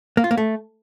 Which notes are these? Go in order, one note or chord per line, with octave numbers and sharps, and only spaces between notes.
A#3
F4
A#3
A3